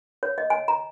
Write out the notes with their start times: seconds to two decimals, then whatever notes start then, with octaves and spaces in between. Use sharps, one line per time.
0.23 C#5
0.38 D#5
0.50 G#5
0.68 A#5